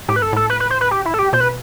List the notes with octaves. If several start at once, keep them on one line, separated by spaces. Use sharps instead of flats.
A2 G4
B4
G2 A4
A2 A4
B4
B4
C5
B4
G4
E4
A4
G4
B2 C5
B4